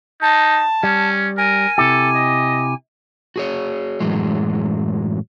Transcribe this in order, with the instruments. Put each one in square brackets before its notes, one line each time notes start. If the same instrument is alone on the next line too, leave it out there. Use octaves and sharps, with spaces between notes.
[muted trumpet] D#4 [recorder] A5
[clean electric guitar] G3 [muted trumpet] C#4
[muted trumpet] A#4 [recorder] G#5
[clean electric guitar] C3 E4 G4 [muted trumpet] A4
[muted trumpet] D#5
[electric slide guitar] F#4 G#4 C#5
F#2 A2 E3 F#3 G#3